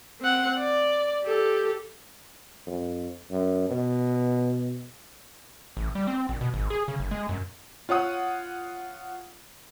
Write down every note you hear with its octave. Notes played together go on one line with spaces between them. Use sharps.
C4 F#5
D5
G4 A4
F2
F#2
B2
A1
G3
C4
A#1
B2
G#1
G#4
C#3
F#1
G#3
F#2
F4 C#5 F#5 D#6